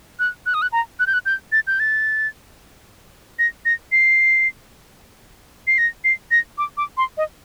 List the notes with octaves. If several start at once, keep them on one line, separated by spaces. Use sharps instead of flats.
F#6
F#6
D#6
F#6
A#5
F#6
G6
F#6
G6
A6
G6
A6
A#6
A#6
C7
C7
A#6
C7
A#6
D6
D6
C6
D#5